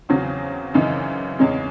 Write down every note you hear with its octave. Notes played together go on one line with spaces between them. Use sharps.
E2 C#3 F#3 C4
F#2 C#3 E3 C4 D#4
E2 C#3 G#3 C#4